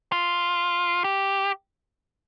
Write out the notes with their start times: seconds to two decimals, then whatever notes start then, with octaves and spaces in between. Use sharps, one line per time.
0.12 F4
1.04 G4